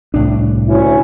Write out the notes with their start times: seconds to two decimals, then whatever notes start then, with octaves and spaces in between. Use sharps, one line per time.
0.14 C2 A2 D4
0.67 D2 C#4 E4